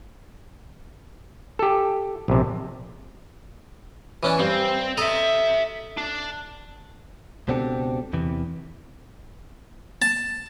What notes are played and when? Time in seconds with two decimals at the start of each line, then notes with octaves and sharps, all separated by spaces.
1.59 G4 A4
2.28 A#1 C3
4.23 E3 C#4 D4
4.40 G2 C4
4.98 A4 D#5 E5 A#5
5.98 D4
7.48 C#2 B2 C4 D4 G4 A4
8.13 E2 C3 E3
10.02 A5